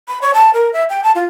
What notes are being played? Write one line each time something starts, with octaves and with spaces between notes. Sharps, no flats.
B5
C#5
A5
A#4
E5
G5
A5
F4